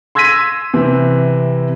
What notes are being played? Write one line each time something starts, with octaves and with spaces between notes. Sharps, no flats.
C6 E6 G#6 A#6 B6 D#7
C3 E3 C4